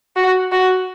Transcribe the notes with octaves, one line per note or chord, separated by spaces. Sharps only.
F#4
F#4